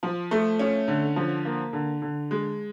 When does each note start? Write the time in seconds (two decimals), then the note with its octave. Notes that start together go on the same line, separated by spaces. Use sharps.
0.03 F3
0.31 A3
0.59 C#4
0.88 D3
1.16 F3
1.45 A#3
1.73 D3
2.02 D3
2.31 G#3